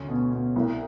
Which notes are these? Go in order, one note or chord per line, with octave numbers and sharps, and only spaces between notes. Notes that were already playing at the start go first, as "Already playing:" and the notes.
Already playing: D2 C#4
B2
B2
C2